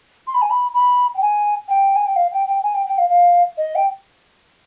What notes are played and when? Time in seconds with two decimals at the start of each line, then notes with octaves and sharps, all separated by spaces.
0.27 C6
0.34 B5
0.42 G#5
0.50 B5
0.74 B5
1.15 G5
1.22 G#5
1.68 G5
1.96 G#5
2.06 G5
2.16 F5
2.32 G5
2.47 G5
2.63 G#5
2.74 G5
2.86 G5
2.98 F5
3.10 F5
3.58 D#5
3.75 G5